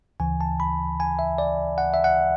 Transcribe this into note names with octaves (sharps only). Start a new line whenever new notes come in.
D2 C#3 E3 G#5
A5
B5
G#5
E5
D5
F#5
E5
F#5